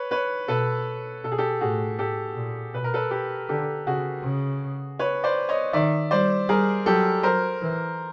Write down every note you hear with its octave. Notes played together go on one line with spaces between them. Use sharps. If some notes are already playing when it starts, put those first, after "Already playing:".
Already playing: B4 C#5
B4 C#5
B2 A4 B4
B2 A4
G#4
G4 A4
A2 F#4 G#4
A2 G4 A4
A#2
B2 B4
A#4
A4 B4
G4 A4
D3 G4 A4
C#3 F#4 G#4
C#3
B4 C#5
C5 D5
C#5 D#5
D#3 D5 E5
G3 C5 D5
G3 G#4 A#4
F#3 G4 A4
F#3 A#4 C5
E3